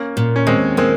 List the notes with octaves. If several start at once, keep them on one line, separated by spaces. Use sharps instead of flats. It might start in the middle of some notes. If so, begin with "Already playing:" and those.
Already playing: A#3 C#4
A#2
C#4
D#2 G#3 C4
G#3 A#3 C4